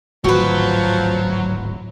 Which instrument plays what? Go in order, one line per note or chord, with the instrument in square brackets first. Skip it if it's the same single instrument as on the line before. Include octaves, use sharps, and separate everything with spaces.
[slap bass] D1 G#1 [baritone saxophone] F3 [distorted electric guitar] F#3 [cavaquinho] F#4 B4